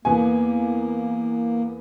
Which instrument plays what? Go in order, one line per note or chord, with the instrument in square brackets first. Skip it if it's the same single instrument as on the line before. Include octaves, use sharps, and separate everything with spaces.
[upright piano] E2 B3 G#5 [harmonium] A#3